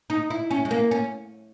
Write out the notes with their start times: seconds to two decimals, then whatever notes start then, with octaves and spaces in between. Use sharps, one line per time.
0.10 D#4
0.30 E4
0.51 C#4
0.65 G#3
0.71 A#3
0.91 C#4